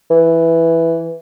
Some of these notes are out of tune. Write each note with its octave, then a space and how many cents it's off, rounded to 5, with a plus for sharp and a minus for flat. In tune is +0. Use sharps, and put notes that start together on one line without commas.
E3 +0